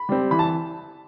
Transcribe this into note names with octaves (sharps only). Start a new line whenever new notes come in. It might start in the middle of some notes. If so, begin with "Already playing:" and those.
Already playing: B5
G3 C4
E3 B5
A5